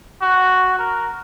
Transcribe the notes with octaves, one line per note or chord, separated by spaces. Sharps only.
F#4
A#4